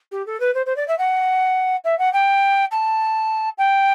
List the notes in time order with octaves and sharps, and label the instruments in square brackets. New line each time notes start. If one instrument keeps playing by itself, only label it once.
[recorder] G4
A4
B4
C5
C5
D5
E5
F#5
E5
F#5
G5
A5
G5